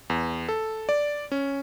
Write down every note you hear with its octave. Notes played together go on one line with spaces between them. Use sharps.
E2
A4
D5
C#4